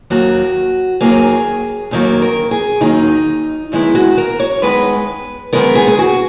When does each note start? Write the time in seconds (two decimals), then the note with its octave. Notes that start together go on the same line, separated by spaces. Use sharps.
0.10 D#2 D#3 F#3 A#3 F#4
1.01 D#2 D#3 F#3 A#3 G#4
1.91 D#2 D#3 F#3 A#3
2.22 A#4
2.51 G#4
2.81 D#2 D#3 F#3 A#3 D#4
3.72 F#2 D#3 G#3 B3 E4
3.95 F#4
4.18 A#4
4.40 C#5
4.62 F#2 D#3 G#3 B3 B4
5.53 F#2 D#3 G#3 B3 A#4
5.75 G#4
5.87 G#4
5.99 F#4